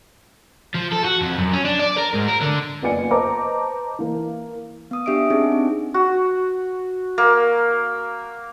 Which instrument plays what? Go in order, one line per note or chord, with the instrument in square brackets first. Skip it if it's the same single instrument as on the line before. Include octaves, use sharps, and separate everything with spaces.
[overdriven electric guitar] F3
A4
F#4
F2
F#2
C#4
D4
D5
A#4
G#2
A#4
D3
[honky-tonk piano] F#1 B3 F4 D5 G#5 C#7
B4 C5 D#5 A5 A#5 D6
E3 A#3
[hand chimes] B3 D#6
D4 G4 E5 D#6 D7
C4 D4 D#4 G#4
C4
[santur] F#4
A#3